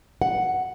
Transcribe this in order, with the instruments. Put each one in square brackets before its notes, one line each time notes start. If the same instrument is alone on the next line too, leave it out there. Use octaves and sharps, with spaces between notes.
[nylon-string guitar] F#5